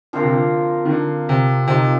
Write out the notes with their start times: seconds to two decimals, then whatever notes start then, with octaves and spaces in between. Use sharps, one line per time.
0.13 D3 F3 C4 F4 A#4
0.23 C3
0.32 D3
0.85 D#3
0.90 D3
1.29 C3
1.67 C3 F3 C4 D#4